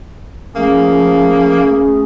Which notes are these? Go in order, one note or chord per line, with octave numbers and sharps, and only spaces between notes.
F3 A3 A#3 C#4 G#4